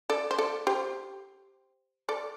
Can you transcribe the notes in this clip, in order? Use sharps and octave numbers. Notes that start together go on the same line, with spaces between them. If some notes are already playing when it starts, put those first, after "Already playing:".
A4 D5
C5
A4 D5
G4 C5
A4 D5